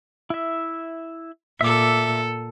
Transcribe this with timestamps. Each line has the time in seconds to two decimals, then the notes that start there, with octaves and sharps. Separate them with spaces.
0.30 E4 E5
1.61 A#2 A4 E5 D6